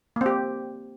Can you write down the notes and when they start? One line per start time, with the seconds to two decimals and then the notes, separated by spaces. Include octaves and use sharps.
0.16 A#3
0.21 C4
0.26 G4